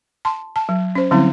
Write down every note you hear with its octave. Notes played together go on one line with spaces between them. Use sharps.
A5 C6
A5
F#3
C#4 C5
D3 F#3 G3 C4 C#4 E4